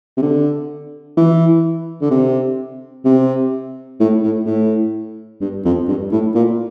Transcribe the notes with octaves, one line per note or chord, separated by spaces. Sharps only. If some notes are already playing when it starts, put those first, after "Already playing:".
C3
D3
E3
D3
C3
C3
A2
A2
A2
G2
F2
G2
A2
A#2